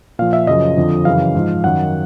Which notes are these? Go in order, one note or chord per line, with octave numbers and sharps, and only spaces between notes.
A#2 F3 F5
E5
F#2 C#3 F3 D#5
F2 D3 F3
F#2 C#3 E3 F5
G#2 F3
F#2 D#3 F#5